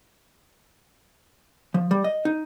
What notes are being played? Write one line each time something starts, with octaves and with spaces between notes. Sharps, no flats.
F3
G3
D#5
D#4